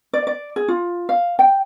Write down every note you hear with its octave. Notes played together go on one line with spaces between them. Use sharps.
D5
D5
G#4
F4
F5
G5